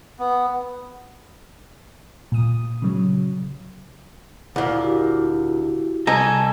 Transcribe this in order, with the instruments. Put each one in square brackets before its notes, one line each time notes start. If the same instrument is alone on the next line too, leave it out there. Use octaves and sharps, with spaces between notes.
[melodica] B3
[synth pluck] A#2 D#6
C#3 F#3
[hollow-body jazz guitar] D2 A#2 [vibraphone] E4
[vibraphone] E4 F#4 G4
[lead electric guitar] C2 A4 [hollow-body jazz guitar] D#5 A#5 [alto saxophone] G#5